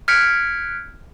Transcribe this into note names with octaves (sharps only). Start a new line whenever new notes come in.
F6 F#6 G#6 B6 C#7 D7